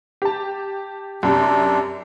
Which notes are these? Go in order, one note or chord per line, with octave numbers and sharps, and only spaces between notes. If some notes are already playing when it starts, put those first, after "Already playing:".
G4 A5
F#2 C3 D4